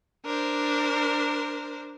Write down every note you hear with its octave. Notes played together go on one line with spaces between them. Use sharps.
D4 A#4 C5